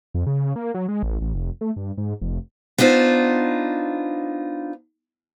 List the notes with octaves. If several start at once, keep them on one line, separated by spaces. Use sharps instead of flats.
F2
C#3
A#3
F#3
G#3
A1
A1
F1
A3
G2
G#2
F1
B3 D4 D#4 F4 C5